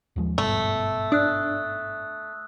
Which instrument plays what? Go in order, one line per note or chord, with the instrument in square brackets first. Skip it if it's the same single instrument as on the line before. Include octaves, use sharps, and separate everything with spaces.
[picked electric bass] D#2 F3 G#3
[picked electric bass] G#1 G2 B2 [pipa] A3 [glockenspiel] E6
[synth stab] D4 [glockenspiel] D#6 F#6